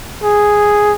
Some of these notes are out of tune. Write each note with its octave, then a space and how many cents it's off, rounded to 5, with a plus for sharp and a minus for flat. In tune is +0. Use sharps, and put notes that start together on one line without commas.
G#4 +0